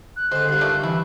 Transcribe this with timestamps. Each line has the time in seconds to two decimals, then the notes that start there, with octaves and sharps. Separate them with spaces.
0.16 F#6
0.31 D3 G#3 D4 C5
0.49 G2 F4
0.61 D#3 A3 D5
0.83 E3 E4